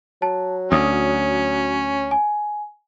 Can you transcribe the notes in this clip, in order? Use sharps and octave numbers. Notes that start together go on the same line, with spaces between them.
F#3 A5
D2 C#4 D#6
G#5